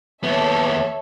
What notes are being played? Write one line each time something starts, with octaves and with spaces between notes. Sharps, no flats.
D#2 B3 A4 C#5 E5